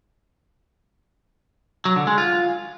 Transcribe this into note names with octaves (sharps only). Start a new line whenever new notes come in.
F#3
D3
G#3
F4